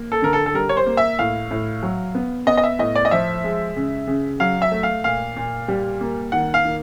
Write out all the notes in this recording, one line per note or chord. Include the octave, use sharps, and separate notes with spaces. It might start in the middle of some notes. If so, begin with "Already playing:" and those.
Already playing: A#3
A4
D3 A#4
A4
A4
G3 A#4
C#5
C5
A#3
E5
A2 F5
A2
F#3
B3
B3 D#5
D#5
E5
A2 D#5
D5
D#5
F3 E5
G#3
C#3
C#3
F#3 F5
E5
A3
F5
A#2 F5
A#2
G3
A#3
D#3 F#5
F5
D#3